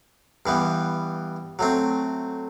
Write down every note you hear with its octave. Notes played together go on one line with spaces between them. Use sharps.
G2 E3 G3 B3
F#3 A3 C4